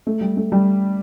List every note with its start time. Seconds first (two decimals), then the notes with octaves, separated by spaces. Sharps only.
0.07 A3
0.21 G3
0.37 A3
0.52 G3